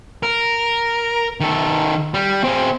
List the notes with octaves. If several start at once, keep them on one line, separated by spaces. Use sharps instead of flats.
A#4
D#3 A4
G3
C4 G#4